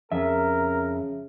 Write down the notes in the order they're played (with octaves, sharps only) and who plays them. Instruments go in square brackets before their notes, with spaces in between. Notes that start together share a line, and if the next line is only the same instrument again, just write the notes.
[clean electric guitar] F2 [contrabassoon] C#3 [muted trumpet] A#4 [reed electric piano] E5